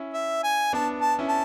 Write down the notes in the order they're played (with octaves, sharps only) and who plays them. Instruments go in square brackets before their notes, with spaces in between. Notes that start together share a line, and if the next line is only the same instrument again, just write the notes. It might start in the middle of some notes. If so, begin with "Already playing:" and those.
Already playing: [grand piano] C#4 E4
[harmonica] E5
G#5
[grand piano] B3 D4 [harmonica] A5
[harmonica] A5
[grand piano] C#4 E4
[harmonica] A5